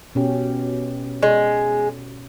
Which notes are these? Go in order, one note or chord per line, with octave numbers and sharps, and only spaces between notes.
B2 C#4 G4
G#3